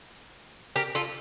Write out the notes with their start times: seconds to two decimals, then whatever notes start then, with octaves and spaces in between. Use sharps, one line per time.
0.76 G4 A#4
0.95 F4 A4